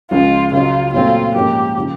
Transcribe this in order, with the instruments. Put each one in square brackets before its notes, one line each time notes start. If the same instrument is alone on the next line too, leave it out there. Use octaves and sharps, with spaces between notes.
[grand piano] C#2 C#3 F3 G#3 [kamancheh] F4
[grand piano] C#2 C#3 F#3 [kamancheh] F4
[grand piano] A#2 F#3 A3 C4 [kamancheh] F4
[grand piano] G#2 F3 A#3 C#4 [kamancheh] G4
[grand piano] C#3 F3